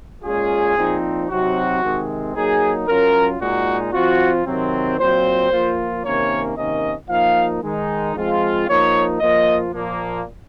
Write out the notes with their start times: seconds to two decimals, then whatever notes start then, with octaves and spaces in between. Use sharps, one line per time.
0.24 A#2 G#3 C#4 F4 G#4
0.77 A#2 F3 C4 D#4
1.29 C3 F#3 C4 D#4 F#4
1.83 C3 D#3 G#3 C4
2.35 F#3 A#3 D#4 G#4
2.88 F#3 C#4 F4 A#4
3.41 A#2 G#3 D#4 F#4
3.93 F3 C4 F4 F#4
4.46 C3 D#3 F#3 C4
4.99 A#2 F#3 C4 F4 C5
5.51 F3 A#3 F4
6.04 C3 D#3 A#3 C#4 C#5
6.57 C3 D#3 A#3 C#4 D#5
7.09 F3 A#3 D#4 F5
7.63 D#3 G#3 D#4
8.15 F3 G#3 C4 F4
8.68 F3 A#3 D#4 C#5
9.20 F3 A#3 F4 D#5
9.73 A#2 F3 A#3